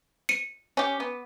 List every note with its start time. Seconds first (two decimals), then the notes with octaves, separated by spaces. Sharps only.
0.29 C#7 D#7
0.77 C#4 G4
1.00 B3